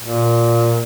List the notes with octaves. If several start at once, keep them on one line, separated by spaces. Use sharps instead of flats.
A#2